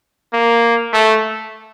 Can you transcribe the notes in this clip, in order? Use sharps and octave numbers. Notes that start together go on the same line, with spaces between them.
A#3
A3